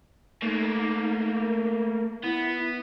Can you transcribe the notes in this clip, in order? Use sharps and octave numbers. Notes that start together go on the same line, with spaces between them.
A3 A#3 D#4
A#4
B3 E4